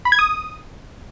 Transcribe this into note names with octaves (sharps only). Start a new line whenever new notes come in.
B5
G#6
D#6